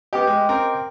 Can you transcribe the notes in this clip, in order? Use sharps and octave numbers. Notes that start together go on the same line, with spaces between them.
B3 G4 D#5 G5 D6
G#3
C4 A#4